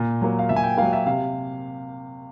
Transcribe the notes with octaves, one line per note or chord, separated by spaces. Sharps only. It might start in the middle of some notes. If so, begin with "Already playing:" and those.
Already playing: A#2
F#3 A#3
F5
A#2 E5
G#5
G5
F#3 A#3 F5
E5
C3 F5